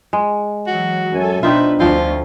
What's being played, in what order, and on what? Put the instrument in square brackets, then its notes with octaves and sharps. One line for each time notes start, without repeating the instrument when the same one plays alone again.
[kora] G#3
[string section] E3 F#3 [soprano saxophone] F#4
[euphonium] F#2 [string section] A4 G#5
[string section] B2 B4 [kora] C4 D#4 F4 [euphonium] D4 [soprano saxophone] E5
[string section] D2 [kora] F3 C4 [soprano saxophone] F4